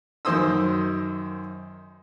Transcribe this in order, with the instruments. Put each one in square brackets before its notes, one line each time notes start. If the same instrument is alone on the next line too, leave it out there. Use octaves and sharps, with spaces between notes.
[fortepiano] F#2 D#3 C5 C6 D#6 E6